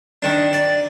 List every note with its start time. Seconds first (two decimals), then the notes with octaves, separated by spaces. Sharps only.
0.22 D#3 D4
0.53 D5